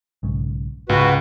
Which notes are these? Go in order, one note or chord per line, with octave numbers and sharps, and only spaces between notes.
B1 G#2 C#3
C#2 G#2 C3 G#3 F#4 B4